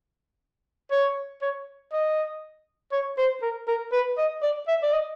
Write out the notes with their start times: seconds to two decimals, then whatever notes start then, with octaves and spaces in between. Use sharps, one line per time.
0.91 C#5
1.42 C#5
1.93 D#5
2.92 C#5
3.18 C5
3.42 A#4
3.68 A#4
3.92 B4
4.18 D#5
4.43 D5
4.68 E5
4.83 D5
4.93 D#5